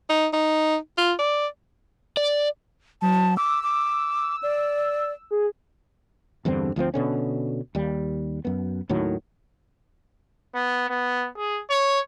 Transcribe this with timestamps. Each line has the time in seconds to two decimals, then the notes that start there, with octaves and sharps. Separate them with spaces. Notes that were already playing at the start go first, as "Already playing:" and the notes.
0.10 D#4
0.33 D#4
0.98 F4
1.19 D5
2.17 D5
3.02 F#3 A5
3.37 D6 E6
3.63 D6
4.43 D5
5.31 G#4
6.45 E2 G2 D3 C4
6.76 D2 F3 G#3 C4
6.94 B2 D3 C#4
7.75 D#2 G3
8.45 F#2 B3
8.89 D#2 A2 D#3 F#3
10.55 B3
10.89 B3
11.37 G#4
11.70 C#5